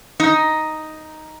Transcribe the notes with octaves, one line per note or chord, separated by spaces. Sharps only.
D#4